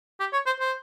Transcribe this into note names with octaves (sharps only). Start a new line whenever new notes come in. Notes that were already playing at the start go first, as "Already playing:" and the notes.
G4
C#5
C5
C5